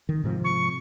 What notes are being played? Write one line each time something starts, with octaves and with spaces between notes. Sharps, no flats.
D#3
G#2 C3 F3
C#6